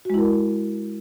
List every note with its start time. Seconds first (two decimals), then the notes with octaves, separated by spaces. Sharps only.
0.05 F#4
0.10 G#3
0.14 E4
0.19 A#4